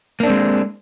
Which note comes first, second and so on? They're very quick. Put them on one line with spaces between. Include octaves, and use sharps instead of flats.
A#3 D4 C4 G#3